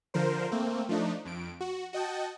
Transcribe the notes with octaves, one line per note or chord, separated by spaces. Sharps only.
D3 F3 A#4 C5
A3 A#3 C4
F3 A3 D4 D#4
F2 D7
F#4
F#4 D#5 G5 A5